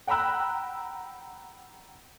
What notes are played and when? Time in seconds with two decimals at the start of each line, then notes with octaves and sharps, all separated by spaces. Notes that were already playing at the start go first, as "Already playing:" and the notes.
0.07 F#5 G5 A#5 B5 E6 F#6